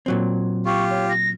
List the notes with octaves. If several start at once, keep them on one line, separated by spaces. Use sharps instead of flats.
A#2 F#3 C4
F4 G4 C#6
C#5
A#6